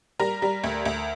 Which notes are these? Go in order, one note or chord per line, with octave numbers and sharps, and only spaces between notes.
G3 A#4 A#5
G3
D2
D2